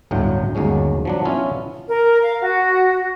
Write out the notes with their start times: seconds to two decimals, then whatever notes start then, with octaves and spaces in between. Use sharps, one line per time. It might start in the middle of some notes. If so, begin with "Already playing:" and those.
0.11 G1 D2 A2 F#3 G5
0.55 G1 D#2 F#3 G#3 C#4
1.05 F3 F#3 D4
1.25 B3 C#4 E4 F4
1.87 A#4
2.22 F5
2.40 F#4